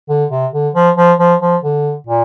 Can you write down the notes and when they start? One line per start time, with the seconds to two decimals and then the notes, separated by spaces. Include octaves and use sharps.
0.09 D3
0.31 C3
0.53 D3
0.75 F3
0.97 F3
1.19 F3
1.41 F3
1.64 D3
2.07 A#2